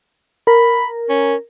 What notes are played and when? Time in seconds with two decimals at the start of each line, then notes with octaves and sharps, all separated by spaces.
0.47 A#4 B5
1.09 C#4